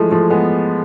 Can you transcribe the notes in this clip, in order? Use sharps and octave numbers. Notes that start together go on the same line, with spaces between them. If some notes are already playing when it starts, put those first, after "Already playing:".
Already playing: E3 F3 G#3 A3
F3 A3
G#3 B3